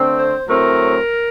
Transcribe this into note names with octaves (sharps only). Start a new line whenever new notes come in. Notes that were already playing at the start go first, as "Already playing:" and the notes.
Already playing: D3 A3 C4
C5
A2 F#3 A3 C4 A#4